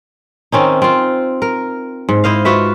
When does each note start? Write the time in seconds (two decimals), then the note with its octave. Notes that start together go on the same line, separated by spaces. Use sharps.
0.52 D#3 C4 C#4 D#4
0.82 C4 F4
1.42 A#4
2.09 G#2
2.24 E4 C5 D#5 F5
2.45 F4 F#4 B4 E5